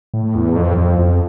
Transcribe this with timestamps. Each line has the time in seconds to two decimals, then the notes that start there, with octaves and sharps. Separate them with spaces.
0.14 A2
0.35 E2
0.56 F2
0.77 F2
0.99 F2